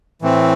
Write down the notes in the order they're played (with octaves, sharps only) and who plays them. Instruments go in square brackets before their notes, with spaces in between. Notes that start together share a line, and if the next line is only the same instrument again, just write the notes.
[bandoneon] A2 E3 A3 C4